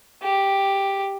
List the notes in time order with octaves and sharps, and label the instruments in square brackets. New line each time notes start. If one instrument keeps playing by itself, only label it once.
[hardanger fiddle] G4